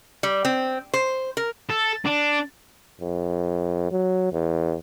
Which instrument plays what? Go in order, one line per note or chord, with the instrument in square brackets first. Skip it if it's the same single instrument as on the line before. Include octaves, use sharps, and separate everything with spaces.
[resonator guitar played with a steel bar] G3
C4
C5
A#4
[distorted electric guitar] A4
D4
[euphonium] F2
F#3
E2